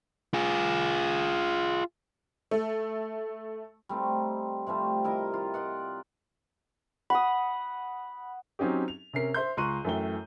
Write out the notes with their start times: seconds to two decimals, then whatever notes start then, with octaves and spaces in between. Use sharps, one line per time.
0.34 F4 G#4
2.51 A3
3.89 G3 A3 C4 D#4
4.67 C3 F3 G3 A3
5.04 E4 A#4 D#5
5.33 F4
5.54 F4 D5 D#5 F#5
7.10 F#5 B5 C#6 D#6
8.59 F#3 C4 C#4 D#4 G4
8.88 F7
9.13 C3 C#4 A#4 C7
9.34 C5 E5 C6 G6
9.57 C#2 A#5 C6 C#6 F#6 D#7
9.85 F#2 E3 A3 G5 G7